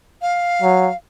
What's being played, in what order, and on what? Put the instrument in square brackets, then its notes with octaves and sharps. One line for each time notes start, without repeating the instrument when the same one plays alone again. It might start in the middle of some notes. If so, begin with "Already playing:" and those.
[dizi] F5
[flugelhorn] F#3